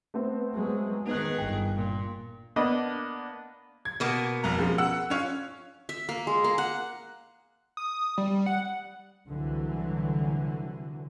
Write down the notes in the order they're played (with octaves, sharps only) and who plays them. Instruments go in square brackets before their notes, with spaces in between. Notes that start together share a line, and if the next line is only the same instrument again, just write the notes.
[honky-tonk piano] A3 B3 C4
[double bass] F#3 G#3
[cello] D#3 G#4 [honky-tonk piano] B3 F#6 [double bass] D#4
[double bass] G1 [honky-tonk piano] G5
[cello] A#2
[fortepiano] A#3 B3 D4 D#5
[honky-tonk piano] G#6
[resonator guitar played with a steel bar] B2 A#3 B3
[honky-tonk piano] F1 C2 A#5
F3 G#3 C#4
F#5 E6 F#6
C#4 F4 C#5
[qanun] E5
A#3
G#3
A#3
F#5
[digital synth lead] D#6
G3
F#5
[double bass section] C2 D3 E3 F#3